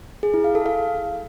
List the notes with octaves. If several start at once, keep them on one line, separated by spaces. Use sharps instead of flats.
G#4
E4
F5
A4
F5